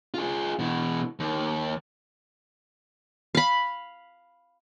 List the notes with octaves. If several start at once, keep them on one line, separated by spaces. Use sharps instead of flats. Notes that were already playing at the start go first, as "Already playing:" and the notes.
F4 G#4
B2 E3
D#2
F5 B5